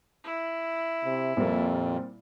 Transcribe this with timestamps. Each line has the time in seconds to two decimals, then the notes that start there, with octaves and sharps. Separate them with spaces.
0.24 E4
1.05 C3
1.37 F2 A#2 G3 A#3 C4